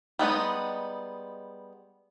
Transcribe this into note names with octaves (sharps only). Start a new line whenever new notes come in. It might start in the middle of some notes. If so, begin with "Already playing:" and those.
G3 G#3 B3 D#4